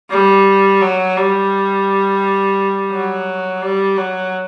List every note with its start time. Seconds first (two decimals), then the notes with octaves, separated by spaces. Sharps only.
0.10 G3
0.81 F#3
1.17 G3
2.91 F#3
3.62 G3
3.97 F#3